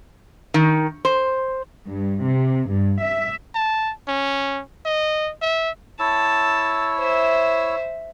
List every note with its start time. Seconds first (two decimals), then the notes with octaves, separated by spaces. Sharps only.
0.54 D#3
1.05 C5
1.87 G2
2.25 C3
2.70 G2
3.02 E5
3.55 A5
4.08 C#4
4.86 D#5
5.42 E5
6.00 E4 C#5 A5 E6
6.99 C5 E5